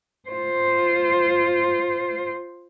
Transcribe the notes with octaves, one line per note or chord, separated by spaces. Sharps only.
F4 C5